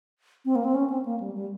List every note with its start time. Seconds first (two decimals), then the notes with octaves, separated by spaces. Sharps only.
0.45 C4
0.56 A#3
0.65 C4
0.75 C#4
0.90 C4
1.05 A#3
1.20 G3
1.35 G3